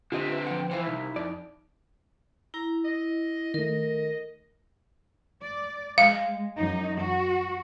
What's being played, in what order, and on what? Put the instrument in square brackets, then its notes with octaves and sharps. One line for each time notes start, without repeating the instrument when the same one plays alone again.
[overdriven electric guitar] D3 C4 [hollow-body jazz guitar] F4 G4 D#5 [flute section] E5
[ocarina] B4
[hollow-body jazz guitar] F3 F#5 [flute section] G5
[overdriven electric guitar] E3 F3 [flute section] E4 [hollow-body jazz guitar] C5 F5
[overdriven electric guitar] C2 [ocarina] D#4
[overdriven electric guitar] F2 [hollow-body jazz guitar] D5
[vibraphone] E4 [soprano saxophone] A#5
[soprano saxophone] D#5
[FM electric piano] D#3 A3 [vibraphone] A#4 [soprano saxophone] D#5
[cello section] D5
[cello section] G#3 [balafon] F5
[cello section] F#2 D#4
F#4